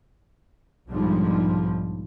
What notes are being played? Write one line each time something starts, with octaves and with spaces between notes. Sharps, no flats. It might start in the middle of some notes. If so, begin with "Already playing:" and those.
B1 G#2 D3 F3 G3